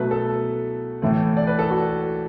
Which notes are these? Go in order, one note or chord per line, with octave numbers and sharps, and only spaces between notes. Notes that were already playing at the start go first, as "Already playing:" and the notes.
Already playing: B2 F#3 A3 B4
A4
A2 E3 A3
D5
B4
A4
F#4